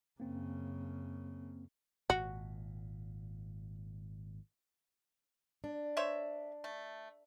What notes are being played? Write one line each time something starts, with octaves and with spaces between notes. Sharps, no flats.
F#2 C#3 A#3 C4
G#1 A#2 F#4
D4
C5 C#5 E5
A3